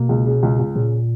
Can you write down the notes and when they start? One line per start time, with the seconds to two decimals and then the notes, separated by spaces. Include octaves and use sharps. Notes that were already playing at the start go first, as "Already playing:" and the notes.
Already playing: B2 A#3
0.09 C#2
0.26 C#3
0.43 C#2
0.59 C#2
0.76 A#2 C#3